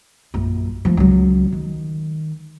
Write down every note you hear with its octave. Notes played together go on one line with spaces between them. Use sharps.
A#1 F#2
F3 A3
C#2 F#3
D#3